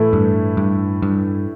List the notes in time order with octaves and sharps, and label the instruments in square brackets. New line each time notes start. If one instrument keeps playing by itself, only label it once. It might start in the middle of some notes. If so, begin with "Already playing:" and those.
Already playing: [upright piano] A2 E3 A3 E4
[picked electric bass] G2
G2
G2